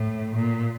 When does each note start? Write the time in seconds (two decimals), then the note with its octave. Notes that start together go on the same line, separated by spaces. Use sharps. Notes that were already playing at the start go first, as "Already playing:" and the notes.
Already playing: A2
0.35 A#2